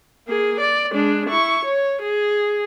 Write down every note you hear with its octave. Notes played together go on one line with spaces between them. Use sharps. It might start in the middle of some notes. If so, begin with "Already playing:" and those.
A#3 G#4
D5
G#3 D4
E4 C#6
C#5
G#4